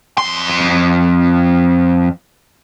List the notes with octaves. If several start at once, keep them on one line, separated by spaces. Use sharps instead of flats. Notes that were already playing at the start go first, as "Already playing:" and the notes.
F2 C6